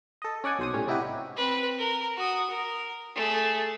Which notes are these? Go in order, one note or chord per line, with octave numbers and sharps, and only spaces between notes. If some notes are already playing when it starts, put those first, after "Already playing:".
A4 D#5
C#4 D5 F#5 G#5
B1 C5 D#6
A2 G3 C#4
C3 D#4 E4 F#4 G4 B4
C4 B4
A#4
F#4 D#6
A#4
A3 G#4